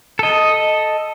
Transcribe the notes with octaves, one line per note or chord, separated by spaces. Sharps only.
A4 D#5